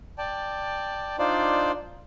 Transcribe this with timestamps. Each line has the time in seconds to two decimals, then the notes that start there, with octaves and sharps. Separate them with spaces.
0.18 D5 G5 A5
1.19 D4 D#4 F4 C5 D5